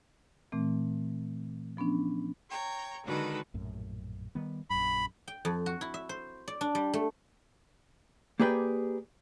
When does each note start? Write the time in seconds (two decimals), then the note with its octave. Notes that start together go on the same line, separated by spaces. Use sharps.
0.52 A#2 E3 A3 C4
1.77 F3 B3 C#4 D4
2.50 C#5 G5 A#5
3.05 D3 D#3 G#3 F#4 A4 B4
3.54 A#1 F#2 A2
4.35 D#3 G3 B3
4.70 A#1 F#2 B5
5.28 G5
5.45 F2
5.66 F#4
5.81 E4
5.94 E5
6.09 C5
6.48 D5
6.61 D4
6.75 G3
6.94 A3
8.40 A#3 G4 G#4 B4 D5 G5